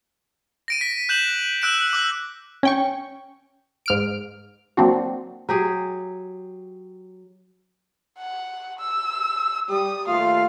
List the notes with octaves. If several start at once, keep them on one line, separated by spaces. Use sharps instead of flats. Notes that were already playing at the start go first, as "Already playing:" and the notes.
A#6 D7 D#7
B6
F#6 G6 E7 F#7
E6 F#6 D7 E7
D6 E6 F#6
C#4 G5 C#6
G#2 F6 D7
F#3 A#3 C4 D4 F#4
F#3 G4 G#4
F#5
E6
G3 D#6
D#2 A3 F4 F5